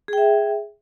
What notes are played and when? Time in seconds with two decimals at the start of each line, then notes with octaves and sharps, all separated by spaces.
0.08 G#4
0.13 G5
0.18 E5